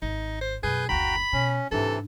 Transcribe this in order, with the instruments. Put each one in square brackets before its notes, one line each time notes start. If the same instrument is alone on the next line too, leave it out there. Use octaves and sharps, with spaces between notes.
[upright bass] G#1 [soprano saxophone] D#4
[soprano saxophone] C5
[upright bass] F#2 B2 [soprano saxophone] G#4 [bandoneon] B4 G6
[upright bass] F#1 D2 [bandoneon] F#4 G5 A#5 [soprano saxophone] B5
[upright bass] B2 [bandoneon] C#4
[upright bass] G#2 D4 [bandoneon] C3 E3 [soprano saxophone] A4